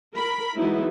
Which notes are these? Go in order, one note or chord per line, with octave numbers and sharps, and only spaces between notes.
A#4 B5
E3 F#3 G#3 B3 D#4 E4